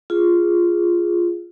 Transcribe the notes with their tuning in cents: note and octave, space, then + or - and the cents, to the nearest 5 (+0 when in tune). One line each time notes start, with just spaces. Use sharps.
F4 -5 G#4 -5